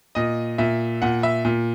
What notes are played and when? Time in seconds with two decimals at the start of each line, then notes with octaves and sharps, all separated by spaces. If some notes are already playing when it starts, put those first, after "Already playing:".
0.15 A#2 D#5
0.58 A#2 E5
1.02 A#2 F#5
1.23 E5
1.45 A#2